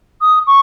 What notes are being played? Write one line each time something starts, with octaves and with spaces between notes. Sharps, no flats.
D#6
C#6